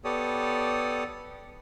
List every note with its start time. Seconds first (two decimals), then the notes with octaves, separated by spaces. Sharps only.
0.04 B3 G4 A4 C#5 D5 D#6